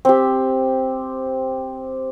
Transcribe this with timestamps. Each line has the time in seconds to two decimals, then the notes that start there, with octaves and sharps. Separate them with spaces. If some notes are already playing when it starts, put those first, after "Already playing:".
0.05 C4 G4